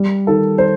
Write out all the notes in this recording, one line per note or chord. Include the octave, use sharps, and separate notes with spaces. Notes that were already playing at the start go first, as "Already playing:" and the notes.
Already playing: G3
D#3 A4
C5